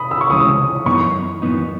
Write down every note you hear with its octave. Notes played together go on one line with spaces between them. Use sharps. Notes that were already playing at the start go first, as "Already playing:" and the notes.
Already playing: B5 D#6
E6
C#6
C#2 C#3 E3 G#3 C#4 D#6
F#2 E3 B3 D#4 C#6
F#2 E3 B3 D#4